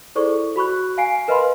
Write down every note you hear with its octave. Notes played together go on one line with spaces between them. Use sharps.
E4 G#4 A4 C5 D5 C#6
F#4 B5 C#6 F#6
F5 G#5 C7 D7
A#4 B4 D#5 F5 B5 C6